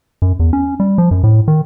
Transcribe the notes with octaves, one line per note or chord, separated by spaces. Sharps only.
F#2
E2
C#4
G3
F3
F#2
A2
D#3